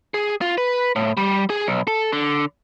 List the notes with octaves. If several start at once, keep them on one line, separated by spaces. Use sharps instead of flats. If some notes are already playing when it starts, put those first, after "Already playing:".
G#4
F4
B4
A2
G3
G#4
B1
A4
D3